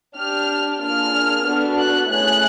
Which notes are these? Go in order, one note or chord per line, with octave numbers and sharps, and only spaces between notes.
D4 G4 F6
A#3 D4 F4 G#4 F6
B3 D4 F#4 A4
F#6
A3 C#4 E4 G#4 F#6